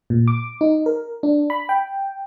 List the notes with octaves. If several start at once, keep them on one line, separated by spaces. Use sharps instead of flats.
A#2
D6
D#4
A#4
D4
B5
G5